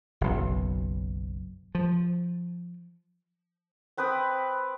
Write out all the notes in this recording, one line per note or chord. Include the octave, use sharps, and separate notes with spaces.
F#1 B1
F3
C4 B4 G5 D#6